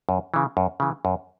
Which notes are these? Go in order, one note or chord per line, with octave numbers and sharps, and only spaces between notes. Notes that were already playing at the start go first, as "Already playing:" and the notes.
F#2
C#3 E3
F#2
C#3 E3
F#2